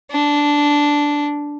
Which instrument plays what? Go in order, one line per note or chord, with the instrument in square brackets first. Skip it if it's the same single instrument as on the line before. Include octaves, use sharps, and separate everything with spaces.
[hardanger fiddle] D4